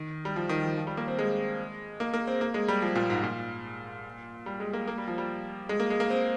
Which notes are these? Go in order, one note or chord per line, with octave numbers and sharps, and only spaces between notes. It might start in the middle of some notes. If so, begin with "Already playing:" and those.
Already playing: D#3
G3
F3
D#3
F3
F3
G3
A#3
C4
G#3
A#3
A#3
C4
A#3
G#3
G3
F3
A#2
G#2
A#2
G3
G#3
A#3
A#3
G3
F3
G3
G#3
A#3
G#3
A#3
C4